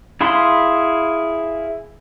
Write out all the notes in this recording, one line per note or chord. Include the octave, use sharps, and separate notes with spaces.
E4 G#4 F5 B5 C6